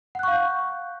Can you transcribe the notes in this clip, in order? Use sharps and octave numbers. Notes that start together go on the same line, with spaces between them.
F5 F#5 C#6 F#6 G6